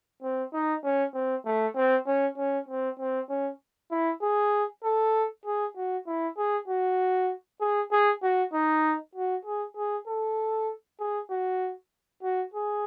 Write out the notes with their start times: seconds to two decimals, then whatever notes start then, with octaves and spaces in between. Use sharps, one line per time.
0.22 C4
0.53 D#4
0.84 C#4
1.15 C4
1.46 A3
1.76 C4
2.07 C#4
2.38 C#4
2.68 C4
2.99 C4
3.30 C#4
3.91 E4
4.23 G#4
4.84 A4
5.46 G#4
5.77 F#4
6.07 E4
6.38 G#4
6.68 F#4
7.61 G#4
7.92 G#4
8.23 F#4
8.53 D#4
9.15 F#4
9.45 G#4
9.77 G#4
10.07 A4
11.00 G#4
11.30 F#4
12.23 F#4
12.54 G#4